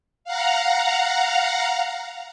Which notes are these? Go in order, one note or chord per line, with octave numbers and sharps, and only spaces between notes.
F5 F#5 A#5